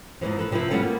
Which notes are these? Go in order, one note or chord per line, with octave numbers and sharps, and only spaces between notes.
E2 G#2 B2 E3 F3
A4 B4
C3 F3 C4 E4 B4
G3 B3 C#4 F4 A4
A#3